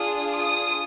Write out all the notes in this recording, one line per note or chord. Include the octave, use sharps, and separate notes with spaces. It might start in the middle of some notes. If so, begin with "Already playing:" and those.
Already playing: D4 F4 G#4 D#6
D#6